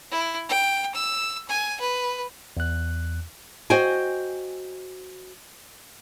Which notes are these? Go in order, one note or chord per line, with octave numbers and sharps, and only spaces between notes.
E4
G5
E6
G#5
B4
E2 F#6
F#4 C5 D#5 G5 G#5